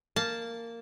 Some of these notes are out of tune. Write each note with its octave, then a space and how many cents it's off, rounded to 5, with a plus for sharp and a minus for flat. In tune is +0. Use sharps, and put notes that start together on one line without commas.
A#3 -10 A5 -5